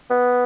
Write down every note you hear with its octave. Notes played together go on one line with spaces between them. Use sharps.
B3